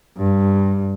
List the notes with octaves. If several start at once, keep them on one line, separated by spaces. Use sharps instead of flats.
G2